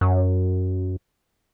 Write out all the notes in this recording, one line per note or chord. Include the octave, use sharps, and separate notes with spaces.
F#2